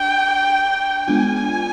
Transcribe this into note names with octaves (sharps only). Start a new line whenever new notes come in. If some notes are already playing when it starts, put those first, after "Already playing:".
Already playing: D4 G5
G#3 B3 D4 F4 G#5